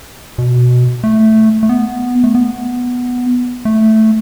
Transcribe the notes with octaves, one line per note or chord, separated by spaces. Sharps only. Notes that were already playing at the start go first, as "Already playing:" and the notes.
B2
A3
A3
B3
A3
B3
A3